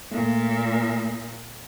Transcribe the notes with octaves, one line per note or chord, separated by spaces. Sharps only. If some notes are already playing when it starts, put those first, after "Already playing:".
A#2 A3 A#3